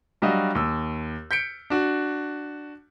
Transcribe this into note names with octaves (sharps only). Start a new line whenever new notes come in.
F#3 G3 D4 F#4 D#5 F5
D#2 E6
G6 B6 C#7 D7
D4 F#4